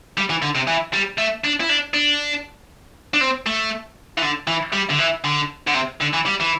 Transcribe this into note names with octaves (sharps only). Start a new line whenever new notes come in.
G3
E3
D3
C3
E3
G3
A3
D4
E4
D4
D4
D4
C4
A3
E3
D3
E3
G3
D3
E3
D3
D3
C3
D3
E3
G3
E3